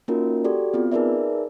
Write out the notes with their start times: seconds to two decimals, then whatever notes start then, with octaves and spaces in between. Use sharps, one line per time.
0.08 A#3 C#4 D#4 F4 F#4 A#4
0.44 F#4 G4 A4 D5
0.74 B3 C4 F4
0.92 D#4 G#4 A#4 B4 D5 E5